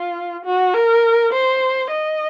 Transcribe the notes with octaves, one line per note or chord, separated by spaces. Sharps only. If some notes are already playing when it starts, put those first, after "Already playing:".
Already playing: F4
F#4
A#4
C5
D#5